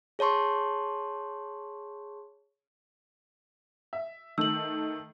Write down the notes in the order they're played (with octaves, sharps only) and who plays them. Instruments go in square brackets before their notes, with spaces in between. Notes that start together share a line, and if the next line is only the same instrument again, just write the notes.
[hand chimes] G#4 C#5 A5 C6 C#6
[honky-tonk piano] E5
[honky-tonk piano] D#3 A3 [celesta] E6 F#7